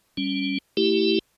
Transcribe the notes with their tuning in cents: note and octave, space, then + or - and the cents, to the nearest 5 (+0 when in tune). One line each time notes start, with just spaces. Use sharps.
G3 +0 C#4 +0
A3 +25 E4 +0 G4 -5